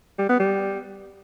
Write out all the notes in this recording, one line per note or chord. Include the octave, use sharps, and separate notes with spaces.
G3
B3
G3